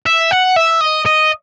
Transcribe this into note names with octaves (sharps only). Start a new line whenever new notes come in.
E5
F#5
E5
D#5
D#5